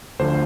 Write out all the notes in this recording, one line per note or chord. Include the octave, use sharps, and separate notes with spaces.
D2 D3 F3 C5